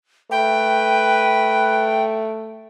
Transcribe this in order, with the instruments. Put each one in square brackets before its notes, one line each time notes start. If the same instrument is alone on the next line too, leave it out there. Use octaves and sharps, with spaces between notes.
[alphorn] A3 [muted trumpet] B4 [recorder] G5